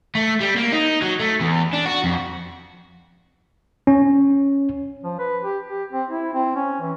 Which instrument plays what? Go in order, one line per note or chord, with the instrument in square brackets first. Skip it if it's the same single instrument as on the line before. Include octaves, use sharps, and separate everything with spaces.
[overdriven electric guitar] A3
G3
A#3
D#4
F#3
A3
E2
D4
F#4
F2
[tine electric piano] C#4
[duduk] F3
B4
G4
G4
C4
E4
C4
C#4
E3